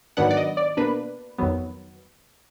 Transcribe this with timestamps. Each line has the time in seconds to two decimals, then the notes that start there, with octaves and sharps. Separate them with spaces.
0.17 G#2 D#3 F#3 B3 D4 F#5
0.31 D5
0.37 D#5
0.57 D5
0.77 B2 A#3 D4 B4
1.38 F2 D#3 F#3 B3